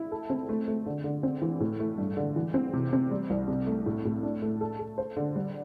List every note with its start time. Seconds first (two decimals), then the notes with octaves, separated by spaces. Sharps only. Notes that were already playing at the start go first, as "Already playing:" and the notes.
Already playing: E4
0.12 A4
0.30 C4
0.49 A3
0.68 A3
0.86 D3
1.04 D3
1.23 C4
1.42 E3
1.60 A2
1.80 A3
1.98 G2
2.17 D3
2.36 E3
2.54 C4
2.73 C3
2.93 C4
3.11 G3
3.30 C2
3.48 C3
3.67 A3
3.86 A2
4.05 A2
4.23 D4
4.42 A3
4.61 A4
4.79 A4
4.98 C5
5.17 D3
5.36 G3